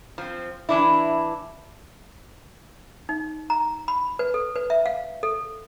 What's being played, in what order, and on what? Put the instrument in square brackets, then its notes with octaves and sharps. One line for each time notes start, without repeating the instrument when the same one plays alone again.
[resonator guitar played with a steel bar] F3 C4
E3 D4 E4
[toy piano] D#4
A#5
B5
B4
A4
B4
E5
F5
A4